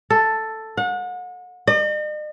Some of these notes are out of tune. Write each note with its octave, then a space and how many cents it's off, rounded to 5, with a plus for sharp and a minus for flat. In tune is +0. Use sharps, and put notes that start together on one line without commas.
A4 +5
F#5 -35
D#5 -45